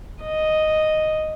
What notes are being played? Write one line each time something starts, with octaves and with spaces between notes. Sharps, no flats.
D#5